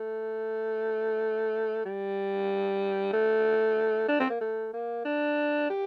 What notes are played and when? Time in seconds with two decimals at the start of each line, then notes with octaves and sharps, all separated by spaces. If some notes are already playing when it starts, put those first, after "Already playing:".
Already playing: A3
1.85 G3
3.13 A3
4.09 D4
4.19 C4
4.30 A#3
4.41 A3
4.73 A#3
5.05 D4
5.70 G4